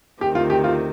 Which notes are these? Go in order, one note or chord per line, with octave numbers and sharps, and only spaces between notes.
D2 C3 D#3 G4
F4
G4
F4